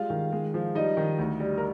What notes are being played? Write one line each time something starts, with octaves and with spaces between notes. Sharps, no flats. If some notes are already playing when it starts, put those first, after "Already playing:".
Already playing: G3 G#3 F4 F5
D#3
G#3
F3
G3 D#4 D#5
D#3
D2
G3
A#4